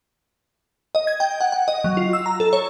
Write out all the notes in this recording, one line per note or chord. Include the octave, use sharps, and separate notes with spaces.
D#5
G#6
G5
F#5
F#5
D#5
F#3
F4
E6
A#5
A4
C#5